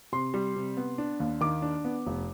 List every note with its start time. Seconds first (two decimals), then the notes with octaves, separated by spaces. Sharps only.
0.12 C3 C6
0.34 G3
0.56 C3
0.77 B3
0.98 D4
1.20 D#2
1.41 D#3 D6
1.62 D4
1.85 B3
2.06 F1